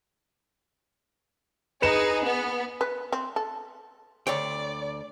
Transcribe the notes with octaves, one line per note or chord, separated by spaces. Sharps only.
D#4 G#4 B4 C#7 E7
B3
B4
C4
A4
D2 C#5 D5 G5